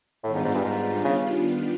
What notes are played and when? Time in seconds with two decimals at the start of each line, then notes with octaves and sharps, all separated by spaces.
0.24 A2 D#3 G3 B3 D4 F4
0.34 G#2
0.44 G#2
0.55 G2
0.64 G#2
1.05 C#3